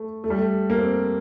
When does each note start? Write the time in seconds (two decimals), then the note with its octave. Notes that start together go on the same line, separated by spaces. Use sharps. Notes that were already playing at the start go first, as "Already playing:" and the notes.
Already playing: A3
0.24 A3
0.30 G3
0.38 A3
0.70 A#3
0.78 C4